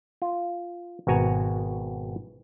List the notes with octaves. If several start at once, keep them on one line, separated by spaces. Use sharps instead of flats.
F4
G#1 B2 F#4 G#5 A#5